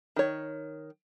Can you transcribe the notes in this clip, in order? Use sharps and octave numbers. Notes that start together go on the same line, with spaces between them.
D#3 C#5